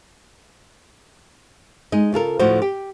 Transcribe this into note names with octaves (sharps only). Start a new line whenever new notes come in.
G#3 D#4 D#5
C#3 F4 A4 A#4
D2 A2 D3 F3 F#4 C5
G4